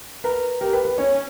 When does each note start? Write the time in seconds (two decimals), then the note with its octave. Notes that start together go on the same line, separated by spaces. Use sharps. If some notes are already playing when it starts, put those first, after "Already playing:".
0.24 A#4 B4
0.60 G4 A#4
0.73 B4
0.85 B4
0.98 C#4 C#5